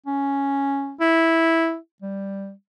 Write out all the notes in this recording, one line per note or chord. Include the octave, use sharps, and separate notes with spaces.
C#4
E4
G3